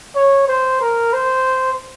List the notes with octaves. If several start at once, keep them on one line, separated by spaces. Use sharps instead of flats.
C#5
C5
A#4
C5